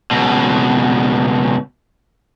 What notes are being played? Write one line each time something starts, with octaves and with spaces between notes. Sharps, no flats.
C#2 B2